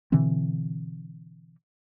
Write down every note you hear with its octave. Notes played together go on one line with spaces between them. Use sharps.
B2 D3 E3 C4